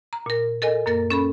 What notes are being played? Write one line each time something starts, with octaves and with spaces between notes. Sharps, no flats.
A#5
A#2 A#4
A4 A#4 D#5 G#5
F#2 A#3 A#4 A6
C#4 A4 B5